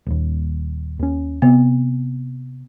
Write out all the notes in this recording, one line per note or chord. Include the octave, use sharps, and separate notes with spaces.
D#1 D#2
D#2 C#4
C3 B3